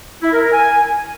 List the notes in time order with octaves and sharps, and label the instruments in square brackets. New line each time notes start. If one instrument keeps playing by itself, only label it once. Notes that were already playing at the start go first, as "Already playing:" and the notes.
[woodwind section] E4
A#4
A#4
G#5